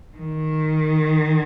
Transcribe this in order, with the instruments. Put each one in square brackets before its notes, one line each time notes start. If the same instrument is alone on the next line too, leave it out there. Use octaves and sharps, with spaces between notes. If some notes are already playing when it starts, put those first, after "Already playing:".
[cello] D#3